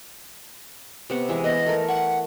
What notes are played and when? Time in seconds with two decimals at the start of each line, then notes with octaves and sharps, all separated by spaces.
1.10 C3 B3 C#6
1.29 E3 G#3 G#5
1.44 B3 D#5
1.66 A3 A#4
1.89 F#5 C#6